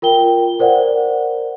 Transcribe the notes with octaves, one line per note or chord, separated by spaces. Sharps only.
F4 A#4 G5 G7
A#4 C5 D5 F#5